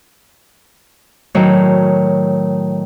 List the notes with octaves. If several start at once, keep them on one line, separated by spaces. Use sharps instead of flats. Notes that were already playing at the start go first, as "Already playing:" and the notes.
A2 D#3 F#3